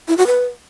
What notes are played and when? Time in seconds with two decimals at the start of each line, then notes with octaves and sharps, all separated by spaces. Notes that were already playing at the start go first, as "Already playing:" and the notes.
0.08 E4
0.17 F#4
0.27 B4